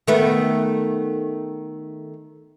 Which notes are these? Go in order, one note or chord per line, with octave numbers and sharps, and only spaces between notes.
D#3 A3 B3